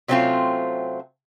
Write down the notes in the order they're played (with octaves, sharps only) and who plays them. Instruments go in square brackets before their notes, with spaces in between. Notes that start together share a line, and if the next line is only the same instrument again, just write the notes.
[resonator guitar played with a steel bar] C3 F#3 A3 C4 C#4 F4